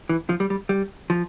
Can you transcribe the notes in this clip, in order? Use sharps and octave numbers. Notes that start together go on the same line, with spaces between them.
E3
F3
G3
G3
G3
F3